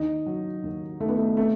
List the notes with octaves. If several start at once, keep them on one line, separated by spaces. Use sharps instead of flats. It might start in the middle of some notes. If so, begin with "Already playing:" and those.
Already playing: D#2 D#4
F#3
D#2
D#2 A3
B3
A3
C3 A3